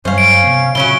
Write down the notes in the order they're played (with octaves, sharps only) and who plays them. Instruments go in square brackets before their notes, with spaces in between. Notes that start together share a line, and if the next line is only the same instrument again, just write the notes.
[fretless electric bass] G2 F#3 G3 [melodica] C#4 [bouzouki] C5 F5
[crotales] D7
[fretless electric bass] C3 B3
[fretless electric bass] A#2 C#3 [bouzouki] F#3 C#4 E4 [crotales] G7